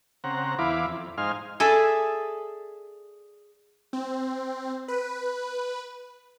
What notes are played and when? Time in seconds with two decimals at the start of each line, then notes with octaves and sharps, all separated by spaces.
0.24 C#3 C4 F#5 A#5
0.59 E2 E4 F5 B5 D6
0.86 F2
1.18 G#2 D#4 C5 F5 G#5 F6
1.60 G#4 A4 D5 E5
3.93 C4
4.88 B4